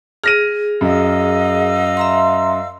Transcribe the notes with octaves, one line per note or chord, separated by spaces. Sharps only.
G#4 F6 A#6 D#7
F#2 D#5 F5 E6
E5 A#5 C6